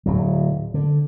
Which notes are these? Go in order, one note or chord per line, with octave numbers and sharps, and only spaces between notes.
D1 F#3
D3